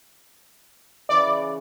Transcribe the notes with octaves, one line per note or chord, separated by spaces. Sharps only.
C#3 E3 D5 C#6